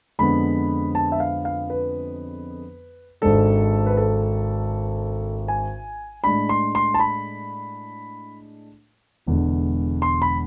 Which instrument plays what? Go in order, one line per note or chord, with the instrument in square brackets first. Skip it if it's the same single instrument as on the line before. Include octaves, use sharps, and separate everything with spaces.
[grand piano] F2 D3 G#3 B3 B5
A5
E5
F5
F5
B4
G#1 G#2 G#3 D4 A4
B4
A4
G#5
A2 G#3 D4 B5
C6
C6
A5
B5
E1 E2 D3 G#3
C6
B5